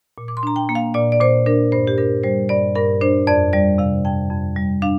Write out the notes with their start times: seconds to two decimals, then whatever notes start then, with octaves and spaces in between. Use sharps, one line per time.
0.18 A#2
0.28 D6
0.37 C6
0.43 D4 A#5
0.56 G5
0.69 A#3
0.75 F5
0.94 A#2 D5
1.12 D5
1.20 A#2 C5
1.46 D4 A#4
1.72 G2 C5
1.87 G4
1.98 D4 A#4
2.23 G3 C5
2.49 G2 D5
2.75 G2 A#4
3.01 D4 C5
3.27 F2 D5
3.53 G3 D5
3.78 C3 F5
4.05 F2 G5
4.30 F2
4.56 G3
4.82 D4 F5